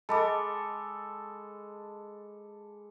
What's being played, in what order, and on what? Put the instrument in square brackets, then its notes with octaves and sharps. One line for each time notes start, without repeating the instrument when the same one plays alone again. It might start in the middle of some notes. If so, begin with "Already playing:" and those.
[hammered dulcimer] G#3 A4 [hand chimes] A5 B5 D6